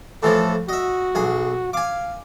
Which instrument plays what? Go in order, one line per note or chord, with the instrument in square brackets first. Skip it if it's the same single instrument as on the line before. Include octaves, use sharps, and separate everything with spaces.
[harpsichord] A2 E3 F3 [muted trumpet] A4
[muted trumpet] F#4 [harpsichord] D#5 E5
[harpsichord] B1 G#4
[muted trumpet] F5 [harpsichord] G#5 D6